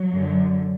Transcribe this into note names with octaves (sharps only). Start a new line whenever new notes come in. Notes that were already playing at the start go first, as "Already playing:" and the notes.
Already playing: F#3
F#2 D3